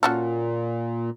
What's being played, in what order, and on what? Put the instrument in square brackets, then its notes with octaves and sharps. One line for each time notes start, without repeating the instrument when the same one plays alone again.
[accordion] A#2 [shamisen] C#4 F#4 A4